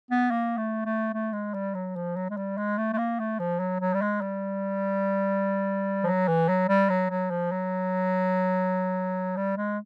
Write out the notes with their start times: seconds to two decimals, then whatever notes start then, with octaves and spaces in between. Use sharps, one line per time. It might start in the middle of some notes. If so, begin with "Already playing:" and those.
0.11 B3
0.31 A#3
0.58 A3
0.86 A3
1.13 A3
1.33 G#3
1.54 G3
1.75 F#3
1.96 F3
2.16 F#3
2.30 G#3
2.37 G3
2.57 G#3
2.78 A3
2.93 A3
2.98 A#3
3.20 A3
3.40 F3
3.60 F#3
3.80 F#3
3.94 G3
4.02 G#3
4.21 G3
6.04 F3
6.07 F#3
6.28 E3
6.49 F#3
6.69 G3
6.90 F#3
7.10 F#3
7.31 F3
7.52 F#3
9.37 G3
9.57 G#3